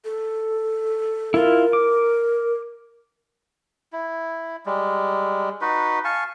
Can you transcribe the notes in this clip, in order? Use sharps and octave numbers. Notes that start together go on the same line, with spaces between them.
A4
E4 F4 A#4
D6
E4
G3 G#3
D#4 F#4 B4
F5 G#5 A5 C#6